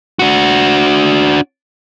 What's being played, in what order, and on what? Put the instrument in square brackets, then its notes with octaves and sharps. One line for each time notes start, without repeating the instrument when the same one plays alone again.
[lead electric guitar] D4 F#4